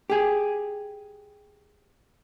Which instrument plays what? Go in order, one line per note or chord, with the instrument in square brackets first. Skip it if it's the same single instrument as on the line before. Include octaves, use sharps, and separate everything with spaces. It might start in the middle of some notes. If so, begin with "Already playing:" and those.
[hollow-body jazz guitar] G4 G#4